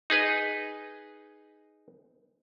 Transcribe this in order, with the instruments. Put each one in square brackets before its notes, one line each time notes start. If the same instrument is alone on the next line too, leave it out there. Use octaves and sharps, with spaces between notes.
[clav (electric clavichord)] D#4 G#4 B4 D#5